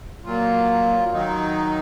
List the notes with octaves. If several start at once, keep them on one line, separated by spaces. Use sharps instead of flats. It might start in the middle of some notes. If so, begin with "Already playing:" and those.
A#2 F#3 A#3 F4
D#3 F#3 D#4